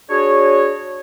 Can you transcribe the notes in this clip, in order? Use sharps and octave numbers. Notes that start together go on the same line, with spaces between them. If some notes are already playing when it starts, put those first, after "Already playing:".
D4 F#4 G#4 C#5